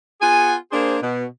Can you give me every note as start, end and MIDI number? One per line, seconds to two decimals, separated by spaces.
0.21 0.54 59
0.21 0.54 65
0.21 0.54 68
0.21 0.54 78
0.21 0.54 80
0.72 0.96 58
0.72 0.96 62
0.72 0.96 68
0.72 0.96 72
1.02 1.23 47